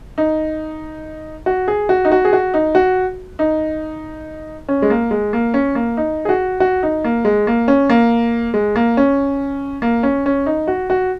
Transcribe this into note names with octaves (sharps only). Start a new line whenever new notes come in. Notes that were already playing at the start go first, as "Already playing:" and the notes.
D#4
F#4
G#4
F#4
D#4
F#4
G#4
F#4
D#4
F#4
D#4
C#4
G#3
A#3
G#3
A#3
C#4
A#3
D#4
G#4
F#4
F#4
D#4
A#3
G#3
A#3
C#4
A#3
G#3
A#3
C#4
A#3
C#4
C#4
D#4
F#4
F#4